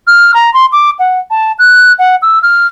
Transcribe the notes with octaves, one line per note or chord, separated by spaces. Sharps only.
F6
A#5
C6
D6
F#5
A5
F#6
F#5
E6
F6